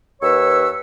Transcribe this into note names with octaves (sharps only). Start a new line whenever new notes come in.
D#2 B4 C#5 C#6 E6